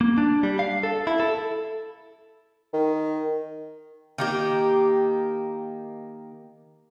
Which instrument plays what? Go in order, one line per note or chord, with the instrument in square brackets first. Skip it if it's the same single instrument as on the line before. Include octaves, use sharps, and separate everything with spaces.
[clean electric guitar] A#3
D4
G3
F5
A4
E4
A4
[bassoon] D#3
[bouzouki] D#3 A#3 G4